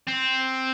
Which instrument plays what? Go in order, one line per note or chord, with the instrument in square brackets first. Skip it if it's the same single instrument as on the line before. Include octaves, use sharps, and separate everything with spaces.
[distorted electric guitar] C4